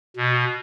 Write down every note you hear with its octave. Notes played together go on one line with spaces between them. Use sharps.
B2